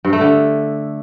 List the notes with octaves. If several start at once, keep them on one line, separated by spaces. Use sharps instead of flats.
G2
A3
D3